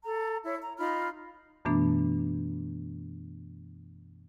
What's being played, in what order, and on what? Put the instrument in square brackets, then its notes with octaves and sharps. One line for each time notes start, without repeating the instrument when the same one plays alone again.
[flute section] A4 A#5
E4 C#5
A#5
D#4 F4 B5 F6
[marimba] F#2 B2 E3 A3 B3 D4